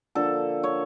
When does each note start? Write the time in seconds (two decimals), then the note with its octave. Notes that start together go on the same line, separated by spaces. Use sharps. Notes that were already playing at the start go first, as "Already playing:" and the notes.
0.15 D3 F3 A#3 A4
0.63 C#5